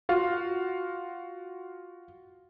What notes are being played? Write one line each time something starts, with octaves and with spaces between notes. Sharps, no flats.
F4 F#4 F5